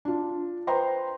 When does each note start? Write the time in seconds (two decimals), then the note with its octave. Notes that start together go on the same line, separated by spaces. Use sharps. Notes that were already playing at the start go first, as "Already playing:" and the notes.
0.05 D4 F4
0.67 B4 C5 G5 A#5 C6